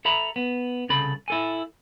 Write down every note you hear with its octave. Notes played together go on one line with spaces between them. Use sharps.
A4 E5 A#5 B5
B3
C2 C#3 A4 B5
E4 A4 G#5